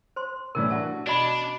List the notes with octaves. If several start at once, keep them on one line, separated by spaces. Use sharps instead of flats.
C5 C6
A2 E3 G3 A#4
D4 F#4 A5
B2 D4 D5 D#5 B5